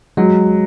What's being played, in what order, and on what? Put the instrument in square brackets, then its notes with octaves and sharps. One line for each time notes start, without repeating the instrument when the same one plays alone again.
[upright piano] F#3 [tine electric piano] G#3